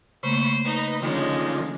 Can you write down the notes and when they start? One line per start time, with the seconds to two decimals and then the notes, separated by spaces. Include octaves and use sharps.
0.23 C#3 A3 A#3 C5 B5 C#6
0.64 D#4 B4 D#5
1.02 D3 D#3 F3 G#3 C#4